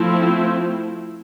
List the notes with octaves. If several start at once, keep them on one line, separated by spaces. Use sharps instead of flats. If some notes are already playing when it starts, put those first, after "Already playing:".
Already playing: F3 A3 C4 E4